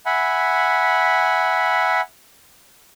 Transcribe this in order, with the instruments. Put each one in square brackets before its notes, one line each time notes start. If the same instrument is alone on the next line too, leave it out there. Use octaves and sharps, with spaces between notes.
[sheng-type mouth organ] E5 F#5 G#5 B5